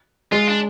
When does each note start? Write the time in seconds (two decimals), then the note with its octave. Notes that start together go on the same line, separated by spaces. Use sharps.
0.32 G#3 F4
0.48 D4